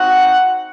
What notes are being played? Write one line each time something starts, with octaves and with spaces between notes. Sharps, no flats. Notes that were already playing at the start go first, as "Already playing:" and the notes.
Already playing: C4 D#4 F#4 F#5